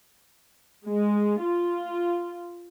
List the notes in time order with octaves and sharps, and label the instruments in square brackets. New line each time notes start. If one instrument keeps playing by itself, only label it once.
[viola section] G#3
F4